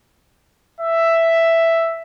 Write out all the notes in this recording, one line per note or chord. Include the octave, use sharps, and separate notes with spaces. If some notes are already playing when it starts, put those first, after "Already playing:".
E5